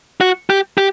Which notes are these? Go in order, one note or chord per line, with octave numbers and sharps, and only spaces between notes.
F#4
G4
G4